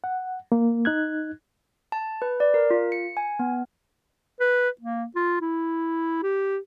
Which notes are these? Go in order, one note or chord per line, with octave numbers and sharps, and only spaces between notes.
F#5
A#3
D#4 F#6 G#6
A5
B4
D5
A#4
F4
C#7
G#5
B3
B4
A#3
F4
E4
G4